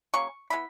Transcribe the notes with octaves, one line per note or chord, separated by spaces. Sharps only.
C#3 F#3 A#3 C#4 C#6
G#3 B3 E4 B5